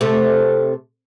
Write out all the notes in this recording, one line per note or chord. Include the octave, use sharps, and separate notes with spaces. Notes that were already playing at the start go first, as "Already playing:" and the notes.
C3 A3